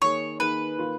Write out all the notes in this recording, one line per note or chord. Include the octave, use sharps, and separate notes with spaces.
D#3 A#3 D#4 G#4 C#5
D#3 A#3 D#4 G#4 B4
D#3 A#3 F4